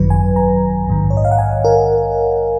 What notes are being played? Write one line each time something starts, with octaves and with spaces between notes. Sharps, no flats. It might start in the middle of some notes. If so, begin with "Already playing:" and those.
Already playing: G#1 F#2 D#3 F#3 B4
G#5
A#5
A#1 G#2 D#3
C#5
D#5
F5
F#5
G#5
A#4